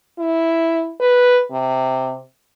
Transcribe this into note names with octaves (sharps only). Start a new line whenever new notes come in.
E4
B4
C3